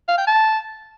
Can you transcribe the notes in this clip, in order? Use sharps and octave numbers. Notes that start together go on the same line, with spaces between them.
F5
G5
A5